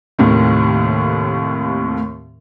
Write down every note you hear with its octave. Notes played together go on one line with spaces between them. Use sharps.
D#2 A2 C3 D#3